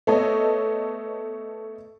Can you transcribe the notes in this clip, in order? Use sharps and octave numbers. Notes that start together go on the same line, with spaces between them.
A3 B3 A4 C#5 D#5